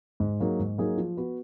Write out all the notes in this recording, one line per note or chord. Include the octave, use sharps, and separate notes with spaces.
G#2
F#3 A#3 D#4 G#4
G#2
F#3 A#3 D#4 G#4
F3
B3 F#4 B4